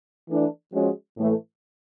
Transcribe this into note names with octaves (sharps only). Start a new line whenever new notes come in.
E3 A3 D4
F3 G#3 C#4 F#4
A2 E3 A3